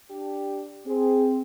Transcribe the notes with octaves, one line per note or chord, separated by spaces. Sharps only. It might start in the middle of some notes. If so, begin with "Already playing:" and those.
D4 G4
C4 G#4